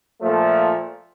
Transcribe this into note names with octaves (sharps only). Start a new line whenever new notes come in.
A#2 F3 A3